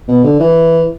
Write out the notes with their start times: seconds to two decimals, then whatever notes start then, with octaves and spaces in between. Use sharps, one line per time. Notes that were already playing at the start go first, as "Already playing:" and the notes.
0.08 B2
0.24 D3
0.40 E3